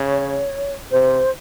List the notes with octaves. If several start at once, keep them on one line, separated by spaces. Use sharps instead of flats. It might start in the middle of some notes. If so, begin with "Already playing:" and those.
Already playing: C#3 C#5
C3 C5